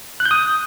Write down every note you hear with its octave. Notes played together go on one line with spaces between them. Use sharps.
F#6
G6
D#6